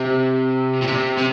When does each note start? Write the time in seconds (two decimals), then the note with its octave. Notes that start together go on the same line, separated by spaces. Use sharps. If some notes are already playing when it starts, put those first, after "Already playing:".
Already playing: C3
0.82 A#2
0.87 C3
1.17 C3